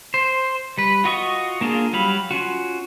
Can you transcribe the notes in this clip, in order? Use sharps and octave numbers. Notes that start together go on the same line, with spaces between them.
C5
G3 B4
F4 F#4 D#5 C#6
A#3 D4 F4 G#4
F#3 G3 F5 B5
C#4 F4 F#4